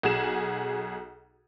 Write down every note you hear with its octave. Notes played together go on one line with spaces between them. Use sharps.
B1 F#4 G#4 E7